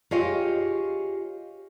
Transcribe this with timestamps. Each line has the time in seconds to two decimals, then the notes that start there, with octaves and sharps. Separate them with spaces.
0.11 F4 G4 G#4 C#5 D#5 F5